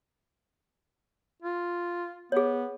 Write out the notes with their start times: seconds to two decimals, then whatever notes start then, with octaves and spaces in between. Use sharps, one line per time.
1.42 F4
2.32 B3 G#4 C#5